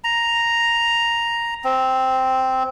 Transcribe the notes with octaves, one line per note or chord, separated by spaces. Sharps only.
A#5
C4